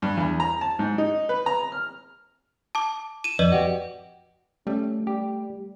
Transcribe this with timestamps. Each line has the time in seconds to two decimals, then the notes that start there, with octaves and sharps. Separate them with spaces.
0.02 G2
0.17 E2
0.40 A#5
0.61 A5
0.79 G#2
0.98 D#4
1.29 B4
1.46 A#5
1.72 F6
2.75 A5 D6
3.24 D#7 E7
3.39 F2 B4 D5 D#5
3.52 F#4 G4
4.67 G3 A3 C#4
5.07 G3 G4